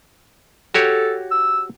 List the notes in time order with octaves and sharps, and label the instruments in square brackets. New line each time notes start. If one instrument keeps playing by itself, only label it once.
[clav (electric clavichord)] F#4 G4 C#5 [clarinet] A4
[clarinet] E6